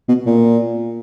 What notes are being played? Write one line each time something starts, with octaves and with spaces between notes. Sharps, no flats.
B2
A#2